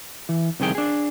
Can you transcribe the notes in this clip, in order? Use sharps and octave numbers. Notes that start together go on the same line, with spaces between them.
E3
C2 F2 D#3 G#4 G5
D4 G#4